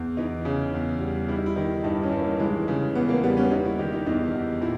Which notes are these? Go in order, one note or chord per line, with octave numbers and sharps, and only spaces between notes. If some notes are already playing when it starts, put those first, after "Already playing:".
Already playing: E2
E3 D#4
C#3
E2
G3
G3 E4
D#4
E4
D#3
G2 D#4
C#4
G2
A#3
E3 G#3
C#3
E2 B3
A#3
G3 B3
C#4
G3 D#4
E4
D#3 G4
D#4
E2 D#4
E2
A#2 E4